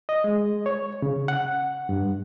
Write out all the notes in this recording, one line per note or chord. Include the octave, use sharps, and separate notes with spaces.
D#5
G#3
C#5
C#3
F#5
G2